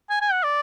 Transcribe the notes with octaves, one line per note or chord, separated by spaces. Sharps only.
G#5
G#5
F#5
D5